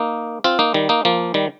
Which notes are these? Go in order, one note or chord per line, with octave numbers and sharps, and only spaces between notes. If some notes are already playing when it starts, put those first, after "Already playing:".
Already playing: A#3 D#4
C4 F4
A#3 D#4
D#3 G3
A#3 D#4
F3 A#3
D#3 G3